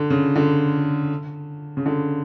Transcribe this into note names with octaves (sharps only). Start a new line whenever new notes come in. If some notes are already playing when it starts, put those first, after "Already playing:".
Already playing: D3
C#3
D3
C#3
D3